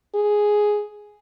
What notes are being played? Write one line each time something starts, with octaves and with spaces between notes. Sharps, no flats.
G#4